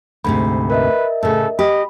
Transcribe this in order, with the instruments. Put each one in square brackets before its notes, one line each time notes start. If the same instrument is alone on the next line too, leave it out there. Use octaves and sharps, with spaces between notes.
[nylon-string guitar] D2 G#2 C3 [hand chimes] B5
[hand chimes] A#4 D#5 E5 [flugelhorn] B4
[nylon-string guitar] A2 C#3 [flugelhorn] A4
[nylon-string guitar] G4 [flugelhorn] D#5 [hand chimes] B5